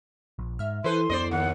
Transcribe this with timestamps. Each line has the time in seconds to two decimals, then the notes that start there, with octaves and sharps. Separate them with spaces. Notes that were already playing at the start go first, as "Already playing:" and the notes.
0.39 A#1
0.59 G#2 E5 F6
0.84 E3 E4 A4 B4 C5 C6 D#7
1.10 F2 B3 C5 D5 D#5
1.31 D#2 F#5